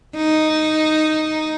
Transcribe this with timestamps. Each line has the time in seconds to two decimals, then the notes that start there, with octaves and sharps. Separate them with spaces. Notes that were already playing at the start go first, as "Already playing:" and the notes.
0.16 D#4